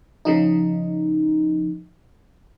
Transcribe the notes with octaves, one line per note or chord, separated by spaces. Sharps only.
C#3 F3 D#4